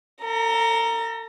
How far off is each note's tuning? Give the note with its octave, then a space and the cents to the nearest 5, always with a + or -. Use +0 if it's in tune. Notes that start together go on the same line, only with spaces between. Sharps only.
A4 +40 A#5 +0